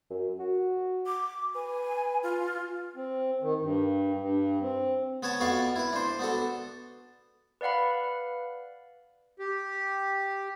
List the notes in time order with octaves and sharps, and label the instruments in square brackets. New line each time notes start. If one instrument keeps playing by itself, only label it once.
[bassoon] F#2
F#4
[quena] D6
[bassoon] B4 [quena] G#5
[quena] F4
[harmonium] C4
D#3
G2
G2
C4
[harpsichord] B3 B4 C#5 A5
F2 B3 F#4 D5 F5 C#6
E4 B4
D4 C5
B3 D4 F#4 A4
[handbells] B4 D5 F5 F#5 B5
[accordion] G4